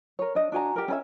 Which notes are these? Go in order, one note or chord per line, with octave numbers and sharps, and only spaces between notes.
A#4 C#5
D4 D#5
D4 F#4 G#5 A#5
G4 A#4
C#4 B4 E5